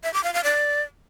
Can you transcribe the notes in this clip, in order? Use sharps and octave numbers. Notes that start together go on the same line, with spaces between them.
E5
D6
F5
F5
D5